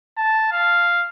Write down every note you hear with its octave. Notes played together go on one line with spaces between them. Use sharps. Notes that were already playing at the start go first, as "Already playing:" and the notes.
A5
F5